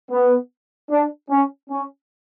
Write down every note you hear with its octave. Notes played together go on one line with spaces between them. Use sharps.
B3
D4
C#4
C#4